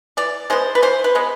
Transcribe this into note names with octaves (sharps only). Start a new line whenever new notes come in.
E3 D5
G#3 B3 C5
B4
E3 C5
B4
G#3 B3